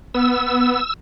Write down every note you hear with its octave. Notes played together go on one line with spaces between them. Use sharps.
B3 E6